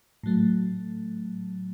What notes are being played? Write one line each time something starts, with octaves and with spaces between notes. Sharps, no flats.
A2 F#3 A3